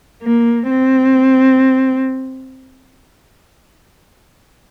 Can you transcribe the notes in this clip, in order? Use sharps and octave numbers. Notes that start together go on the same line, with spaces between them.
A#3
C4